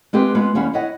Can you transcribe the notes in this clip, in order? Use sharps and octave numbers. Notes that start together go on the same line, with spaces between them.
G#3 B3 C4 F4 G4 B4
G#3 B3 F4
D#2 G3 C#4 E4 F5 F#5
E4 C#5 D#5 F#5